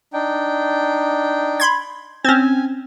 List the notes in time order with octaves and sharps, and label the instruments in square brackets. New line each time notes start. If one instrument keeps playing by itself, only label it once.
[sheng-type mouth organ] D4 D#4 G5
[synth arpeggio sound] B5 C6 G#6
[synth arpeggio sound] C4 C#4 [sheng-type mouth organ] G#5